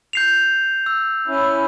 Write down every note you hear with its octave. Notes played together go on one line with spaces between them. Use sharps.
G6 C7 F7
E6
C#4 E4